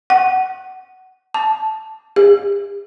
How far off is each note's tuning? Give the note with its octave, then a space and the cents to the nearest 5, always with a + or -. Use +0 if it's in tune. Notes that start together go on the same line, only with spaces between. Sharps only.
F#5 +15
A5 -5
G4 +40